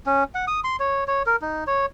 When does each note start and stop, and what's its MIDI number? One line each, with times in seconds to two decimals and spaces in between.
0.06 0.24 61
0.35 0.45 78
0.48 0.60 87
0.64 0.76 84
0.80 1.04 73
1.08 1.23 73
1.26 1.36 70
1.42 1.64 63
1.67 1.86 73